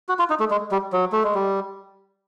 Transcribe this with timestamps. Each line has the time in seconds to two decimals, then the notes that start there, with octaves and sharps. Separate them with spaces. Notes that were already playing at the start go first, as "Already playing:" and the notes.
0.09 F#4
0.19 F4
0.30 D#4
0.40 A3
0.51 G#3
0.71 G3
0.92 F#3
1.12 A3
1.24 G#3
1.35 G3